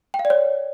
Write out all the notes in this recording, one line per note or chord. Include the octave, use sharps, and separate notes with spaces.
G5
F5
D5
C#5